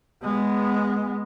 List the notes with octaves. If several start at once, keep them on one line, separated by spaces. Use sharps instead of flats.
G#3 B3